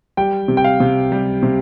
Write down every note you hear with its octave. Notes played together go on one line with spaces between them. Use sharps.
G3 G5
C3
G5
F5
C3
G3
C3